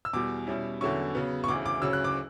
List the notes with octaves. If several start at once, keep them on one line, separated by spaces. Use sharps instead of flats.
E6
E2 B2 G3 D6
B2 G3 C#4 E4
E2 D3 F#3 C#4 E4 C#6
C#3 F#3 B3
C#6
D2 C#3 E3 D6
D6
D2 C#3 F#3 C#4 E6
F#6
D6